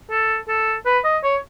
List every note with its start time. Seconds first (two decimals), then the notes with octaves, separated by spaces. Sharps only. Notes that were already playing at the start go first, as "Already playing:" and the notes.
0.11 A4
0.48 A4
0.86 B4
1.04 D#5
1.23 C#5